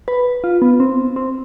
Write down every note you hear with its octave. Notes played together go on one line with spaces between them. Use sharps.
B4
F4
B3
C4
C4